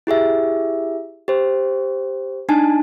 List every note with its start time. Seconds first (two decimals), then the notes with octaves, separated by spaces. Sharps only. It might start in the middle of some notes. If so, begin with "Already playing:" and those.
0.07 E4 G4 G#4 E5
1.28 G4 C5
2.49 D4 D#4 G#5 A5